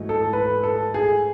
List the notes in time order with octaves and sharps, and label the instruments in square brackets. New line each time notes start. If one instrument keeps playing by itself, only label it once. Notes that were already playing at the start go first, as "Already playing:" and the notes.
Already playing: [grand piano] G#2 E3 A3 D#4 F#4
[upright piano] A4
B4
A4
G#4